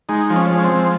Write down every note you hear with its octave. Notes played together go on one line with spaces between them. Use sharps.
G#3 D#4
F3
C#4
G#3
C#4
C4
F3